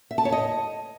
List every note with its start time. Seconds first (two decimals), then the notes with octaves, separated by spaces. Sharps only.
0.11 E5
0.18 A5
0.25 C#5
0.32 D#5